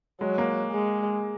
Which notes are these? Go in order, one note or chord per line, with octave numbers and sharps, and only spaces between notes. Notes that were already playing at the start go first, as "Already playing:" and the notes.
F#3 G#3
A#3
G#3